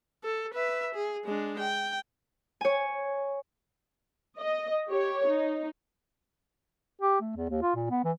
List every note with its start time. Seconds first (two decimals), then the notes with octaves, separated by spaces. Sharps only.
0.24 A4
0.54 B4 E5
0.95 G#4
1.25 G#3 D4
1.59 G5
2.61 C#5 G#5
4.38 D#5
4.88 G4 C#5
5.27 D#4
7.01 G4
7.21 A3
7.36 E2
7.50 D#2
7.62 F4
7.75 A#2
7.90 B3
8.05 E3